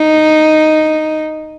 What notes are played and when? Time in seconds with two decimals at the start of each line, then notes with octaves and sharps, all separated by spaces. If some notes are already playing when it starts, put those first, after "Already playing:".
Already playing: D#4